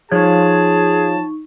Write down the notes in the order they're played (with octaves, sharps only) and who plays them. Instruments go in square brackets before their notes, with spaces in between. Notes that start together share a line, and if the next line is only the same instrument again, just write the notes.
[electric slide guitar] F3 C#5 [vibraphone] D#4 C#6 [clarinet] G#4 [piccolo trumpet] A5